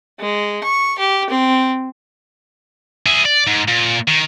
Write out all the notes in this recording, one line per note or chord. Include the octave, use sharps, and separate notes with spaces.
G#3
C#6
G4
C4
E4 G#4
D5
G#2
A#2
D#3